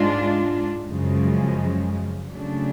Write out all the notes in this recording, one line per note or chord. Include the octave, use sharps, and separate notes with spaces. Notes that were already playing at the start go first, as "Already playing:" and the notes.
Already playing: G#2 G#3 D4 F4
F#2 C#3 F3 G#3
C#3 F#3 A3 D4